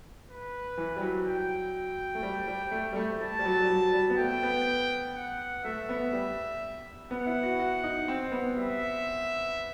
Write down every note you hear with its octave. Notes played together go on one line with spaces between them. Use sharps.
B4
E3
G3
F#3
G5
A3
G3
G3
A3
G3
A3
G3 A5
G3
F#3
G3
F#3
G3
B3
A3 G5
B3
F#5
A3 E5
B3
G3
B3 F#5
E4
F#4
F#4
D#4
C4
B3
G3 E5